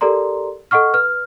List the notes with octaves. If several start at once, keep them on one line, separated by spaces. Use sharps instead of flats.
G4 A4 A#4 D5 A#5 C6
A4 D#5 F#5 C#6 F6
B4 F6